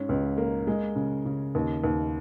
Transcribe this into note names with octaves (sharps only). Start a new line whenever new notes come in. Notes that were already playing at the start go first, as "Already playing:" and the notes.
Already playing: G#2 C#4
C#2
A#3
G#3
C#3
C#3
D#2
D#2